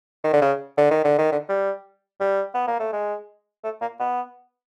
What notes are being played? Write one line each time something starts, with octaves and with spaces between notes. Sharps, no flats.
D#3
D3
C#3
D3
D#3
D3
D#3
D3
G3
G3
B3
A#3
A3
G#3
A3
A#3
B3